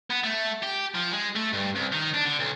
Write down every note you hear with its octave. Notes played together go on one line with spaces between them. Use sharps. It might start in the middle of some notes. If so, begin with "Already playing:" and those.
B3
A3
G4
F3
G#3
A3
G2
C2
D#3
D4
D3
B1